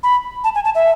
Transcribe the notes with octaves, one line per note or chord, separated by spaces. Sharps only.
B5
A5
G#5
A5
E5